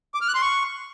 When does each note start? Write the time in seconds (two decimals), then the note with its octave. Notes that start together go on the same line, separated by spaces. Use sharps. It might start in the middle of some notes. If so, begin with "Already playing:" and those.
0.14 D6
0.21 F6
0.28 F#6
0.35 C6
0.42 C#6